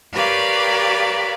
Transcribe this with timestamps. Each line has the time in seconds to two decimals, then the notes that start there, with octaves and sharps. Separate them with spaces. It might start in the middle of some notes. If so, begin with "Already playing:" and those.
0.13 G4 A#4 B4 C#5 D5 F5